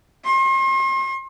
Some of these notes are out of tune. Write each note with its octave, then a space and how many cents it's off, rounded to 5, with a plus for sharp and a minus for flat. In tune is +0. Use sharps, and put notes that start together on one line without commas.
C6 +40